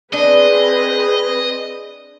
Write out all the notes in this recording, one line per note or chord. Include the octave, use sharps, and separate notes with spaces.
C4 D4 G#4 B4 D#5